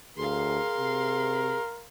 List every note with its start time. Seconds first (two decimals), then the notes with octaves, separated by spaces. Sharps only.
0.17 D2 G#4 A#4 F5 C6
0.78 C3